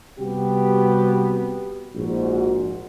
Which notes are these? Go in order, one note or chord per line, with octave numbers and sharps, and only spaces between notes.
C3 G3 B3 F#4 G4
A#1 G#2 F#4